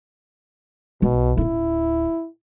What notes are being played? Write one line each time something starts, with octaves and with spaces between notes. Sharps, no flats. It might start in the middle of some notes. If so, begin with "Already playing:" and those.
B1 B2
D1 C#4 E4